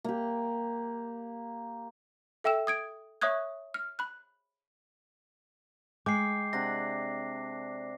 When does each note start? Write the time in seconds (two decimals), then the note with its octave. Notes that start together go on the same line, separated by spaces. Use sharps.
0.04 A#3 G4
2.44 A4 E5 G5 E6 E7
2.67 D#6 G#6 D7
3.21 C#5 E5 C#6 D#6 F#6 G#6
3.74 F6
3.99 B5 F#6
6.06 G#3 G5 D6 C7
6.53 C3 D4 F#5 A#6